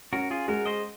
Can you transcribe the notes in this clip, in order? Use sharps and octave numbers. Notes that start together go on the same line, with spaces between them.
C#4 F#4 A#4
F4 G#4
G#3 F#4 A#4
C5 D#5